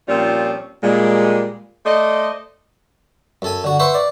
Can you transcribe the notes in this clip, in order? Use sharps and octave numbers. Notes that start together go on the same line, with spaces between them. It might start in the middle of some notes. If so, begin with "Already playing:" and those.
A#2 F3 G3 C4 C#4 F4
A#2 G3 G#3
A3 C5 D5 D#5
F#2 A4 G#5
D3 F#4
B4 C5 E5 F#5 C#6
D5